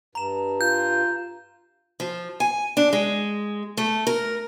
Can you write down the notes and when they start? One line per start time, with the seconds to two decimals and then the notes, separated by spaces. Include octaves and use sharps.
0.15 G2 A#5 E7
0.61 F4 G6
2.00 F3
2.40 G#5
2.77 D4
2.93 G#3
3.77 A3
4.07 A#4